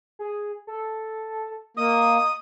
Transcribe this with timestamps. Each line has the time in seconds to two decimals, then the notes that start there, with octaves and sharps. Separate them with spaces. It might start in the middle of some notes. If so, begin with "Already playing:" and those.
0.19 G#4
0.67 A4
1.77 A#3 D#5 D#6